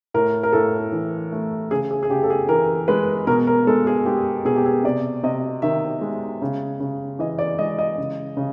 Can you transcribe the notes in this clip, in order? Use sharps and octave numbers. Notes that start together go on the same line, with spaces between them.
A2 A#4
A#4
A2 A4
E3
A3
C#3 G#4
G#4
G#4
C#3 G4
A4
G#4
E3 A#4
G#3 B4
B2 A#4
A#4
G#3 A4
G#4
G#3 G4
B2 G#4
G4
G#4
C3 D5
C3 D#5
D#3 E5
G#3
C#3
C#3
E3 D#5
D5
G#3 D#5
D#5
C#3
C#3